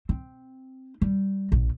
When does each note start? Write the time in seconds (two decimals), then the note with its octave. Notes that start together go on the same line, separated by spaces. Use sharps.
0.09 C4
1.01 G3
1.52 A#1